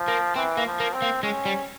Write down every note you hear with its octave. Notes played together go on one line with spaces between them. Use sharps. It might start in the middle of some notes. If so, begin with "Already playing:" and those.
Already playing: F3
A#3
E3 C4
A#3
F3
A#3
C4
A#3
G#3 C#4
G3